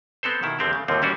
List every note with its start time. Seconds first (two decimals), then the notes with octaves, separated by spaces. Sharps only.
0.23 B3 C4 A4 C5
0.43 B2 D#3 E4
0.59 E2 D3 G#3 C4 G4 A#4
0.73 C#3 A3
0.88 D#2 A2 D3 F3 F#3 C4
1.02 E3 G3 C#4 D4 F#4